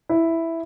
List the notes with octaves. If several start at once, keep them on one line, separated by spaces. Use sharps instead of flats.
E4